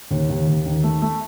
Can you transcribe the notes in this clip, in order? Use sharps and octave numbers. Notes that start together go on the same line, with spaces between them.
D#2
D#2
D#2
D#3
A3
A3